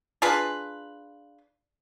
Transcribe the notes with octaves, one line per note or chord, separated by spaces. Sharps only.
D4 F4 G#4 B4